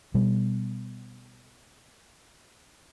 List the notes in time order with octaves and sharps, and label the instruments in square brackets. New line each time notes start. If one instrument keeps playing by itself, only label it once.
[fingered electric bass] B2 G3